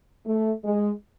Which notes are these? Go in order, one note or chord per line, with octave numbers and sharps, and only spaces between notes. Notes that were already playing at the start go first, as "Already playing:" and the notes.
A3
G#3